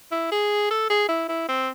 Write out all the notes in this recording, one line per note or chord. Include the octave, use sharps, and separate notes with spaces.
E4
G#4
A4
G#4
E4
E4
C4